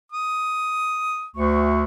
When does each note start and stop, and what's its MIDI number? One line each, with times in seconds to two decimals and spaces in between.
0.12 1.25 87
1.36 1.84 38
1.36 1.84 85